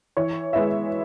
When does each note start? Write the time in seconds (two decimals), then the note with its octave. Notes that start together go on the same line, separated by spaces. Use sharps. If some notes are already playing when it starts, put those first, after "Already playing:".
0.17 E3 C#5
0.53 G#3 B3 E4 E5